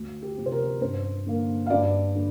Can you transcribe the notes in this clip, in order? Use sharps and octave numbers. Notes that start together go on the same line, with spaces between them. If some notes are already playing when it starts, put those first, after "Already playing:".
Already playing: D2
G4
C3 F3 C4
C5
A#4
G2 C5
D3 A#3
F5
G2 D5
D3